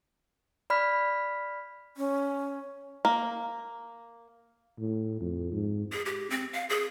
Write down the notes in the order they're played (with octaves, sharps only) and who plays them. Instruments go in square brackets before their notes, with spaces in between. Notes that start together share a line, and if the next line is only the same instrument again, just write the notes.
[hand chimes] D5 B5 F6 B6
[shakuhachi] C#4
[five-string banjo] A#3
[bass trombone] A2
F2
G#2
[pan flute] G#4
G4
C4
F5
G#4